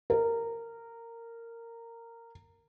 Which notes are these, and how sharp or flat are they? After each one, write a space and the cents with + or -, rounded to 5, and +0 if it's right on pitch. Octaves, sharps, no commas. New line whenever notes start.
A#4 -15